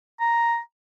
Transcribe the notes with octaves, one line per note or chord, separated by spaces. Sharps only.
A#5